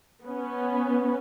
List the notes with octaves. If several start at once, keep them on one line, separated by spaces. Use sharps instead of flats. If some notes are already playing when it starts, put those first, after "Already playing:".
B3 C#4